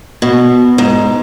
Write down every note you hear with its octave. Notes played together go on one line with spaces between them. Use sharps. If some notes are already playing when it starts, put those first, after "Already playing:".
B2
G#2